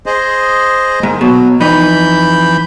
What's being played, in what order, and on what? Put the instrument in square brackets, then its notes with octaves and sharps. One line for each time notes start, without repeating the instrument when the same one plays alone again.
[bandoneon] G#4 C5 D#5
[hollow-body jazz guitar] G#2 [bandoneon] D#3
[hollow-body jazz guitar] B2 [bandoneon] F#3
[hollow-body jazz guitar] F2 D#4 [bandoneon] E3 B5 G6